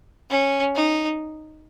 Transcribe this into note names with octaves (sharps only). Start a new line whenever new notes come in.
C#4
D#4